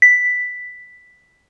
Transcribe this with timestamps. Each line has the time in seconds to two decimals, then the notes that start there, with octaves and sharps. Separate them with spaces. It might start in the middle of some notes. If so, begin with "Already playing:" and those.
0.02 B6